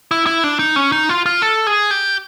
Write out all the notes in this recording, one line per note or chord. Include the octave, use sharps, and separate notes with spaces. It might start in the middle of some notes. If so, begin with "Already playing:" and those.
E4
E4
D4
D#4
C#4
D#4
F4
F4
A4
G#4
G4